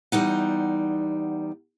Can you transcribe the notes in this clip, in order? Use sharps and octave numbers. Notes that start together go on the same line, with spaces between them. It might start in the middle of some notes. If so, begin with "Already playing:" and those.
E2 G3 D#4 F#5